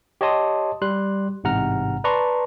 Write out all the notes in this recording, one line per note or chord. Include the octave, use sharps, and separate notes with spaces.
G4 C#5 D#5 A5 C6 D#6
G3 C6 F#6
A1 G#2 C3 F#5 A#5 F6
B4 D5 A5 A#5 C6 C#6